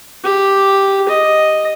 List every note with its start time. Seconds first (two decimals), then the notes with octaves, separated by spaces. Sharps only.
0.24 G4
1.09 D#5